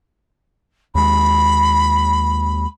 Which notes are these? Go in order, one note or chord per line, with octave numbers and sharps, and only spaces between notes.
D#2 G#3 B5